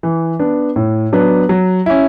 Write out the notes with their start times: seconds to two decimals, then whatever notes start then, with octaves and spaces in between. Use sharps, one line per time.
0.03 E3
0.39 B3 D4
0.76 A2
1.13 F#3 B3 D4
1.49 F#3
1.86 C#4 E4